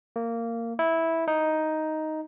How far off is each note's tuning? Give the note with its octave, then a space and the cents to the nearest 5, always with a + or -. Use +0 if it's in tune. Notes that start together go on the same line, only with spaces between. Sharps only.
A#3 -15
E4 -10
D#4 +5